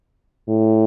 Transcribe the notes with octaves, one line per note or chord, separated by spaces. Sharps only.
A2